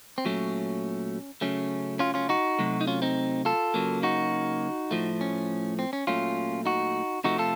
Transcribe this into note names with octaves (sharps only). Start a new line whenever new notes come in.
C4
A#2 F#3 A3 C#4
C#3 F#3 A3 C#4
C#4 F4
C#4 F4
D#4 F#4
C3 F#3 A3
D#4
C#4 F4
C4 D#4
F4 A4
C#3 F#3 A#3
D#4 F#4
A2 F3 A3
C#4
C4
C#4
A#2 F#3 A3 C#4 F4
D#4 F#4
C3 F3 A3 D#4 F#4
F4 A4